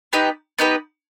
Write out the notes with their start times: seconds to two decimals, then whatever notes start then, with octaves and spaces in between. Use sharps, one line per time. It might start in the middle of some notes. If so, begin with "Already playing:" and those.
0.13 B3 D#4 G4 B4
0.59 B3 D#4 G4 B4